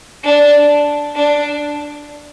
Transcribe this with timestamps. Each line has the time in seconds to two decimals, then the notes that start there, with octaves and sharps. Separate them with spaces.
0.24 D4
1.15 D4